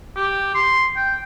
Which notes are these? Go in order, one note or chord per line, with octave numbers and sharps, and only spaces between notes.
G4
C6
G5